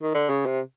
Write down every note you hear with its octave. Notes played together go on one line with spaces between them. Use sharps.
D#3
D3
C#3
C3